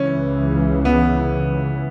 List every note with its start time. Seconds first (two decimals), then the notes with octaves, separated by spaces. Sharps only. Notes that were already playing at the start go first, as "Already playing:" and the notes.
Already playing: C#2 C#3 E3 C#4
0.85 B3